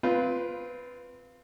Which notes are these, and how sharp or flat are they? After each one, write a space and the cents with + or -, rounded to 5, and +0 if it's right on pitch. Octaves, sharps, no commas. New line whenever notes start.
C4 -20 F4 +0 B4 +0